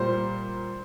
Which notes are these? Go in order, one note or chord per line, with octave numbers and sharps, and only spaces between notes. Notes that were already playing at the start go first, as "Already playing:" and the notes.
Already playing: A#2 G3 C5